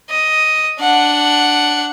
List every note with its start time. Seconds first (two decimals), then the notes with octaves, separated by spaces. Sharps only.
0.10 D#5
0.80 D4 F#5